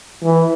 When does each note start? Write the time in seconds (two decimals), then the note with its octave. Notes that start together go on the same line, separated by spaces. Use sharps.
0.23 E3